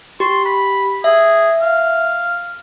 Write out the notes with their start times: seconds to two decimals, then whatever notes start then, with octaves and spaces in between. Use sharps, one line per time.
0.20 G4 C6
0.45 B5
1.04 G#4 E5
1.61 F5